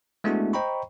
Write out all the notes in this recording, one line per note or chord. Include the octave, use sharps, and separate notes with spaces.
G#3 A3 B3 D4 E4 F#4
C5 D#5 G5 A#5 B5 C#6